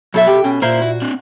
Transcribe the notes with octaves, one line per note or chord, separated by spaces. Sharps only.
B2 F#3 A4 E5
G4 G5
B2 C#4
A#2 A#3 E4 C5 E5
F#4
C4 D4